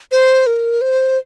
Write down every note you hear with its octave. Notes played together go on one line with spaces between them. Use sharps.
C5
A#4
C5